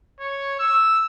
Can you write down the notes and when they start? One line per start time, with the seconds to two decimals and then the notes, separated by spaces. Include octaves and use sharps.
0.19 C#5
0.59 E6